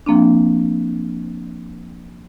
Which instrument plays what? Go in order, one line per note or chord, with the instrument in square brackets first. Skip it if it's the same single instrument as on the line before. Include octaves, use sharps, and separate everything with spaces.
[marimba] F3 A#3 C4 D4